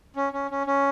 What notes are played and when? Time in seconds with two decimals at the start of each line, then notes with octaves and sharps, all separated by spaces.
0.16 C#4
0.33 C#4
0.51 C#4
0.67 C#4